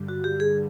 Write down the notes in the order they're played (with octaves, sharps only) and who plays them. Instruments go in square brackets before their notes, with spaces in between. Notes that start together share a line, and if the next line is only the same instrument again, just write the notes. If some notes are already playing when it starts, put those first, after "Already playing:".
Already playing: [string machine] G2 D3 G3
[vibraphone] F#4
G4
G#4